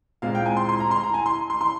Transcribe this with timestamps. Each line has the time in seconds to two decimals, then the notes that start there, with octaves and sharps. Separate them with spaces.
0.22 A#2 G#3 C4 F5
0.35 G5
0.46 G#5
0.57 C6
0.69 C6
0.80 A#5
0.91 C6
1.03 A#5
1.14 G#5
1.26 C6
1.50 C6
1.61 C6